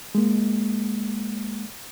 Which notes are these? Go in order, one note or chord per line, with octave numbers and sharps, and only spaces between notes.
G#3 A#3